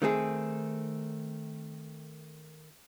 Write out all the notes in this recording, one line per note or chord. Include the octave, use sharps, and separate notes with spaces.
D#3 A3 C4 G#4